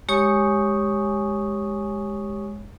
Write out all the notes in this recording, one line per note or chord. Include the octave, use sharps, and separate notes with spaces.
G#3 G4 C#5 G#5 C#6 D#6